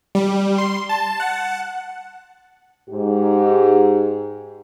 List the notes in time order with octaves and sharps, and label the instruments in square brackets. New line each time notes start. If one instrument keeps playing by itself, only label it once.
[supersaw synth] G3
C6
A5
F#5
[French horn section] G#2 G4